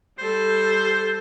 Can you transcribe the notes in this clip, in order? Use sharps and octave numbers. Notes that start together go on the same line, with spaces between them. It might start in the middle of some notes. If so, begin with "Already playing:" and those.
G3 A4 C5